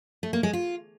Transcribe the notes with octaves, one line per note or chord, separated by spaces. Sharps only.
A3
A#3
G#3
F4